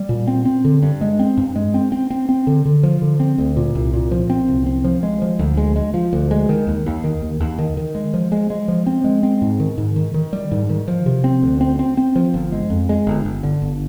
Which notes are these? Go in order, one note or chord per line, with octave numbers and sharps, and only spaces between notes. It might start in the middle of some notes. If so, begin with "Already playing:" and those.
Already playing: G3
A#2
C4
C4
D3
G2
G#3
C4
G2
G#3
C4
C4
C4
C4
D3
D3
F3
D3
C4
D2
A#2
C2
A#2
F3
C4
C2
C4
F3
G#3
F3
D2
G#3
G#3
F3
D2
G#3
D#3
D#2
D#2
D#3
D#2
D#2
D#3
D#3
G#3
F3
G#3
G#3
F3
C4
G#3
C4
G#2
D#3
G#2
D#3
D#3
G3
G#2
D#3
F3
C3
C4
D2
C4
C4
C4
F3
G1
G#3
F2
G#3
G1
G1
D3
G1